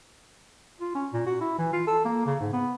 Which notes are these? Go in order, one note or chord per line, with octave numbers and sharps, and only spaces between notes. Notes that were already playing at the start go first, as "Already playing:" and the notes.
F4
C#4
A#2
F#4
E4
E3
F4
A4
A#3
C#3
G#2
B3